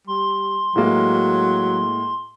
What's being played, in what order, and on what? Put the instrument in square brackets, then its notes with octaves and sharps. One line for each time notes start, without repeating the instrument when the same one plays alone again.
[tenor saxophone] G3 [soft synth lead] C6
[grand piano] A2 G#3 A#3 [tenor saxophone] F#3